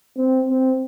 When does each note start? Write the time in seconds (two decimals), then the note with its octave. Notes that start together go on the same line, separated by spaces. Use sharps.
0.17 C4
0.49 C4